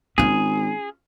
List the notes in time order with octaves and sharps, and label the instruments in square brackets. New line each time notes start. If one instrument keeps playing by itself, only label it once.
[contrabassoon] G#1 [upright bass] C#4 F4 [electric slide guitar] G#4